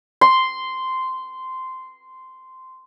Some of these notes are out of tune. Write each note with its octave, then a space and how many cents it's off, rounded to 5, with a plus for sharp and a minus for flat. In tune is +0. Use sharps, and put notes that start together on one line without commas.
C6 -10